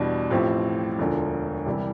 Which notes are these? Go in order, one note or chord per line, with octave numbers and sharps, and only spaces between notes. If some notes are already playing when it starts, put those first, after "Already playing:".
Already playing: E2 B2 G3 D4
A1 A2 F3 C4 G4
E1 D2 D3 F3
C2 C3 E3 G3